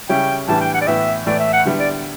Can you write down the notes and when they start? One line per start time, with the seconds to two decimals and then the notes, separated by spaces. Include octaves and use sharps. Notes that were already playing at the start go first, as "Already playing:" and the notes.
0.09 C#3 G3 C#4 E4 G5
0.48 A2 E3 G3 D4 A5
0.61 G5
0.74 F#5
0.81 D5
0.87 A2 E3 B3 E4 E5
1.26 A2 E3 A3 E4 D5
1.40 E5
1.53 F#5
1.65 D3 G3 B3 E4
1.79 D5